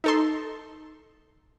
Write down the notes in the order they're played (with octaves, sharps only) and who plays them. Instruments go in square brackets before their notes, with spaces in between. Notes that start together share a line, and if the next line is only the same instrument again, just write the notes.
[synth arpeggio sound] D#4 A4 C6